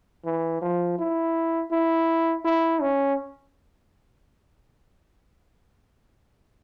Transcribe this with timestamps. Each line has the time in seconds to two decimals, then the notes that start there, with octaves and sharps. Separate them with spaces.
0.25 E3
0.62 F3
0.99 E4
1.71 E4
2.45 E4
2.81 C#4